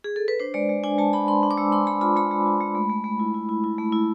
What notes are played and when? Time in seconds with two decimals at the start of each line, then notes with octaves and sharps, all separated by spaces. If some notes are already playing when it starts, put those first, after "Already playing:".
0.04 G#4
0.16 A4
0.28 B4
0.40 D4 C5
0.54 G#3 D5
0.69 G#3
0.84 D4 G#5
0.98 G#3 A5
1.13 D4 B5
1.28 D4 C6
1.43 D4
1.51 D6
1.57 G#3 E6
1.72 D4 C6
1.87 G#3 B5
2.01 F4 B5
2.16 G#3 B5
2.31 G#3
2.46 F4
2.60 G#3
2.75 A3
2.90 A3
3.04 A3
3.19 E4
3.34 E4
3.49 E4
3.64 E4
3.78 A3
3.92 E4